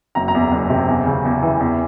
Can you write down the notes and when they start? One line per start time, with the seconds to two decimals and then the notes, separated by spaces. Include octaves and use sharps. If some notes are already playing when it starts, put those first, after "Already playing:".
0.15 F#1 A#5
0.28 A#5
0.34 E2
0.51 F#1
0.70 C3
0.88 E2
1.06 C#3
1.25 E2
1.43 E3
1.60 E2